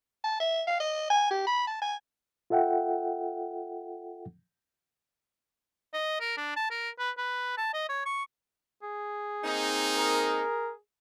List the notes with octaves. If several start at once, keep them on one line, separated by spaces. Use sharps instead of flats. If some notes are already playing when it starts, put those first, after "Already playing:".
A5
E5
F5
D#5
G#5
G4
B5
A5
G#5
F4 A4 E5 F#5 G5
D#5
A#4
D4
A5
A#4
B4
B4
A5
D#5
C#5
C#6
G#4
A#3 C4 D#4
A#4